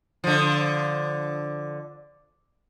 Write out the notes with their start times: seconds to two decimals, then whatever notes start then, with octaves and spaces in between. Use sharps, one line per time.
0.24 D3 F3